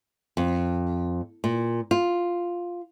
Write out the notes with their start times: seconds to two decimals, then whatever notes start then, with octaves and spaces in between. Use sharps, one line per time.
0.37 F2
1.44 A#2
1.91 F4